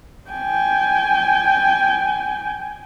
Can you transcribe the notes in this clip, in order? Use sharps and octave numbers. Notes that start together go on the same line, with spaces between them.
G5 G#5